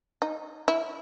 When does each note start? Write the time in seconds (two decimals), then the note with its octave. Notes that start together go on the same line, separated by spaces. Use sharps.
0.22 D#4
0.68 E4